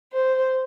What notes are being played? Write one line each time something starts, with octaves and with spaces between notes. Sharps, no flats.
C5